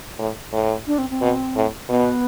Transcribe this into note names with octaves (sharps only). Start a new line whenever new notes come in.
A2
A2
D4
C4
C4
B2
A2
B2 B3